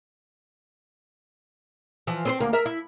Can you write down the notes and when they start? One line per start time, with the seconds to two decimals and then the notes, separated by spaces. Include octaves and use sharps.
2.07 E3 F3
2.25 C4 B4 C5
2.40 D2 A#3
2.53 A#4 E5
2.66 E4